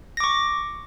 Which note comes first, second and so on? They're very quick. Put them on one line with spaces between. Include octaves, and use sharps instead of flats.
A#6 D6 C#6